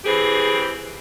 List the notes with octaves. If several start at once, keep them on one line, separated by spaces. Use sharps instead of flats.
E3 C4 G4 G#4